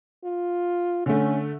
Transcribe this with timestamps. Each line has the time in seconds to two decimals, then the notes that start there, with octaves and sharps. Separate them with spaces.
0.24 F4
1.06 D3 A3 C#4